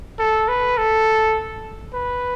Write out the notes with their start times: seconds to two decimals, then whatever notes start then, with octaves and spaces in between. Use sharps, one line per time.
0.19 A4
0.48 B4
0.77 A4
1.93 B4